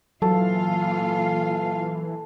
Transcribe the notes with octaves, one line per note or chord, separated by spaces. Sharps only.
A#2 E3 F#3 F4 A4 F5